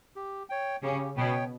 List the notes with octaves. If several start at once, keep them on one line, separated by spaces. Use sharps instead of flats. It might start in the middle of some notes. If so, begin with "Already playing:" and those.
G4
C#5 G5
C#3 C#4 G4
B2 B3 C#5 G5